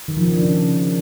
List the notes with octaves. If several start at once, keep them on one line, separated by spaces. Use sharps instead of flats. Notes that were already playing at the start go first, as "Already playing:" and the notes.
D#3
F3
C#3
D4
C#3